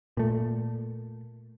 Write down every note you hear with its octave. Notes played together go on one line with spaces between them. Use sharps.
A#2 A3